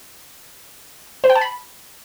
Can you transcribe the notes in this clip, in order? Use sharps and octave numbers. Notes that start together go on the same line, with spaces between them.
C5
G5
A5
B5